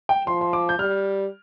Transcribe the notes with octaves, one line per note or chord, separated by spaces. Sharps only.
G5
F3 C6
C6
D6
G6
G3 F6